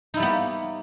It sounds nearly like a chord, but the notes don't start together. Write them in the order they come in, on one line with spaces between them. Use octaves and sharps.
D#4 E4 G3 B3 A#3